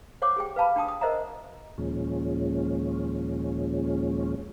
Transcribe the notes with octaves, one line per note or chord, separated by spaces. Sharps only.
C5 C#5 F#5 C#6 D6
G4 G#4 G5
B4 F5 A5 B5
D4 G5 A5 D#6
D#6
A#4 C5 D#5 E5 F#5 A#5
D#2 A#2 F3 G#3 C#4